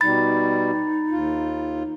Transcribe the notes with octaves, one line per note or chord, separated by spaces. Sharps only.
B2 G3 D#4 B5 A6
D#2 F4